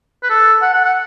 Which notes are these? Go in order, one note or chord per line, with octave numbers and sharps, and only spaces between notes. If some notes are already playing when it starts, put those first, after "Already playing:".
B4
A4
F#5
F#5
F#5